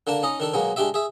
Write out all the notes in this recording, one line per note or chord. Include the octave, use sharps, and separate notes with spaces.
D3 A#3 D4 A5
C#4 D#4 D#5
D#3 D4 A4
B2 F#3 G#3 A#3
G#3 D4 G4 D5 E5
G#4 E5